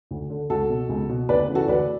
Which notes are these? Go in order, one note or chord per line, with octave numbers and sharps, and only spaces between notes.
D2
D3
C#2 F#4 A4
B2
C#2
B2
D2 B4 D5
C#3 E3
F#4 A4
D2 B4 D5